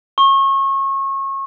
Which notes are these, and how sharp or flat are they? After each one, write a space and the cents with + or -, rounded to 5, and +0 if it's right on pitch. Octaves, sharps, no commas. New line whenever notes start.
C#6 -30